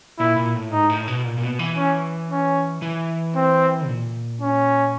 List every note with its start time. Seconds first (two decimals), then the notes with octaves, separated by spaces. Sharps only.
0.19 A#2 E4
0.37 A#2
0.55 A2
0.71 G#2 D#4
0.90 A2
1.08 B2
1.24 A#2
1.38 A#2
1.42 B2
1.59 E3
1.77 C#4
2.30 C#4
2.82 E3
3.36 C4
3.87 A#2
4.41 C#4